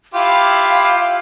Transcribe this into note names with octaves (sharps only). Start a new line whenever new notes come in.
E4 F4 G4 F5